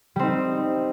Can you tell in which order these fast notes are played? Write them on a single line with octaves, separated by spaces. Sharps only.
G3 C4 D#4